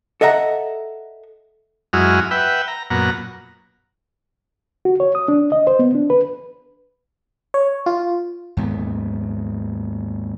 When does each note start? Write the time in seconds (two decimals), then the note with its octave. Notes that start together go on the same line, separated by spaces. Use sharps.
0.21 A4 D#5 E5 F#5 A#5
1.93 F#2 G#3 E4 F#4 D#6 F6
2.31 B4 E5 F#5 G5
2.68 A#5
2.90 F#2 A#2 B3 F#5 A#5
4.85 F#4
5.00 C#5
5.15 D#6
5.28 D4
5.52 D#5
5.67 C5
5.79 B3
5.95 D4
6.10 B4
7.54 C#5
7.86 F4
8.57 D#2 G#2 B3